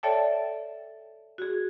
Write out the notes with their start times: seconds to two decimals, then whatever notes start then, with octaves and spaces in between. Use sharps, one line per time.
0.03 A4 C#5 D5 E5 G5 A5
1.38 F#4 G#4